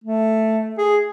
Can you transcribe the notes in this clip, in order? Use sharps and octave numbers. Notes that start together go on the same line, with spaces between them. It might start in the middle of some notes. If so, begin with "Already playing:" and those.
A3
G#4